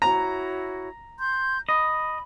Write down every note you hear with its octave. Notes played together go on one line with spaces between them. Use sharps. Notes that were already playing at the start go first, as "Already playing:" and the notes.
E4 F#4 C#5 A#5
C6 G6
D#5 B5